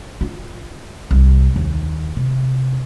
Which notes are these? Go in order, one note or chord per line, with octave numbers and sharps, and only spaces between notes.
F4
C2
D#2
C3